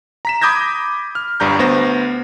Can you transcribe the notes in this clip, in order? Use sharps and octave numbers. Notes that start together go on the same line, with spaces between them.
A#5 B6 E7
B5 D6 D#6 G6 G#6 A#6
F6
G1 G2 G3 A#5 G6
D2 B3 C5 A#6